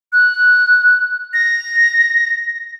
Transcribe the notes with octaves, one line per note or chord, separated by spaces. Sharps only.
F#6
A#6